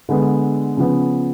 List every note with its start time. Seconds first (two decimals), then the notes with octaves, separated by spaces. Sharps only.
0.09 D3 G#3 B3
0.77 C#3 F3 B3